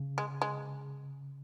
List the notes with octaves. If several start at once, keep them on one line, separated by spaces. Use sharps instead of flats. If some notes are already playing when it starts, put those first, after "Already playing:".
Already playing: C#3
G#3
G#3